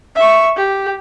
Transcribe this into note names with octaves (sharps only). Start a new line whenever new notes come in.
E5 C#6
G4